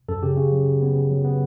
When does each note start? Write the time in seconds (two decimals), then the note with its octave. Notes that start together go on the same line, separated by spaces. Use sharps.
0.09 F#2 A4
0.23 C#3 G4
0.37 C#3
0.52 F#3
0.67 C#3
0.82 B3
0.95 C#3
1.11 F#3
1.25 B3